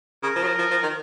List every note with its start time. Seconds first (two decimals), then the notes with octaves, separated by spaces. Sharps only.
0.23 C#3 A#4
0.35 F3
0.43 F#3
0.47 F3
0.59 F3
0.71 F3
0.82 D#3